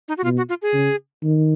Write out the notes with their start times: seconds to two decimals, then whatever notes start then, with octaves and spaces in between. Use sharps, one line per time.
0.08 D#4
0.18 F#4
0.24 B2 F4
0.37 F#4
0.49 F4
0.62 G#4
0.73 C#3
1.24 D#3